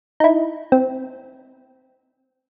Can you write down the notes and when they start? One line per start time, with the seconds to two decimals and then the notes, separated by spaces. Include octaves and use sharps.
0.20 D#4 E4
0.72 C4